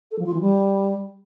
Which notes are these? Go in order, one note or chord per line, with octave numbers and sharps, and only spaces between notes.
A4
F3
F4
E3
G3